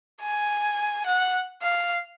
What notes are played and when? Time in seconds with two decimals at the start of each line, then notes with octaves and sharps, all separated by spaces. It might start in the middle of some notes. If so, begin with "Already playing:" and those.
0.22 G#5
1.06 F#5
1.63 F5